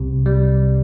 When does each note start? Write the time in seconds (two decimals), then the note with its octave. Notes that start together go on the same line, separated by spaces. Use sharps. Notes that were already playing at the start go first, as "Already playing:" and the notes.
Already playing: C2 C3
0.26 G3